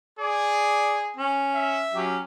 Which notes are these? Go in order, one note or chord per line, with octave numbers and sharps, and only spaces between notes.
G#4 D5
C#4
E5
F#3 C#4 G4